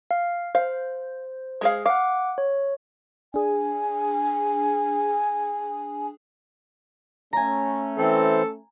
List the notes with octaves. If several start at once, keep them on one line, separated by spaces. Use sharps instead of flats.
F5
C5 F5
G#3 G#4 F5
F5 F#5 D6
C#5
D4 G#4 G#5
A3 C#4 G#5 A#5
E3 C4 A4